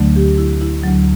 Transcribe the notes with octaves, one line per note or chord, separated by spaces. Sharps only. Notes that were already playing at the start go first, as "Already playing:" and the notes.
Already playing: D2 D3 F#3 A3
G4
E4
E4
D2 D3 F#3